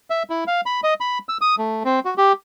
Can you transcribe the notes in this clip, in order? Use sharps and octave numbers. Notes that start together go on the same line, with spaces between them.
E5
E4
F5
B5
D#5
B5
E6
D#6
A3
C4
F#4
G4